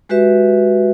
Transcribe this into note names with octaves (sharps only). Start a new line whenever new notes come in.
G#3 F#4 G4 B4 E5